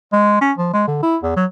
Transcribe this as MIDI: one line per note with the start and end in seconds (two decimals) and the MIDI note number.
0.13 0.40 56
0.41 0.52 61
0.58 0.73 53
0.73 0.84 56
0.88 0.98 50
1.03 1.17 64
1.23 1.33 40
1.36 1.45 54